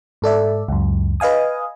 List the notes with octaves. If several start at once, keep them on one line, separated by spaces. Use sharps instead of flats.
G#2 A4 D5 E5
C#2 F#2
B4 D#5 F5 G#5 D#6